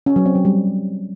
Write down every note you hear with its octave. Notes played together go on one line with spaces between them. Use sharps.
C#4
F#3
C4
F#3
G3